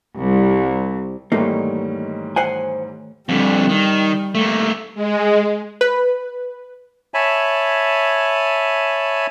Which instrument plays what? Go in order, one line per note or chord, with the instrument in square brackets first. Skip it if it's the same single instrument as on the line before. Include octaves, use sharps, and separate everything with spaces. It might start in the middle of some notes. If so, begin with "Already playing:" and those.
[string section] C2
[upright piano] E2 G#2 G3 [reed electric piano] D#3 A3 C#5 [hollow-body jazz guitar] A#3 D#4
[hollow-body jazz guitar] C5 F#5 G#5
[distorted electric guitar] F2 D3 [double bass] G3
[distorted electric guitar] D#3
A3 A#3
[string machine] G#3
[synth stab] B4
[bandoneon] C#5 E5 G#5 A5 B5